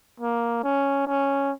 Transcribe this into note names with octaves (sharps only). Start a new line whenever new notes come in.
A#3
C#4
C#4